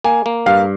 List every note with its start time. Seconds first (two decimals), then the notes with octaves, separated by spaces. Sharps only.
0.04 A#3 G#5
0.26 A#3
0.46 G2 F5